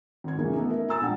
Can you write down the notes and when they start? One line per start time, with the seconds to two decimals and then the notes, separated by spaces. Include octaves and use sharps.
0.24 G#1 G#6
0.39 F2 C#3 E3 F#3 A#3 C#4
0.54 A3 B3 D#4
0.70 A#4 E5
0.88 G#5 A#5 E6 A6
1.01 A#1 G3 D4 F#5 G5